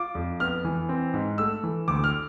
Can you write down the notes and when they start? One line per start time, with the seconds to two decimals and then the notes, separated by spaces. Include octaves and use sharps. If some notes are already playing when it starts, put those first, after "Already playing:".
Already playing: F4 D6
0.15 F2
0.40 B3 F6
0.65 E3
0.89 C4
1.14 G#2
1.38 A3 E6
1.63 E3
1.88 D2 D6
2.04 F6